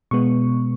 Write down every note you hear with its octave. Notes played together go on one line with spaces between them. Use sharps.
B2 G#3 B3 C#6